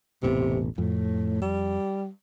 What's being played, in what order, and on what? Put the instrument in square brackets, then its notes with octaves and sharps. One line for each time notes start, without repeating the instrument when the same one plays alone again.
[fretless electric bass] E1 A1 B3 [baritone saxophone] C3
[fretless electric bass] F2 [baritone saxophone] A2
[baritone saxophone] G3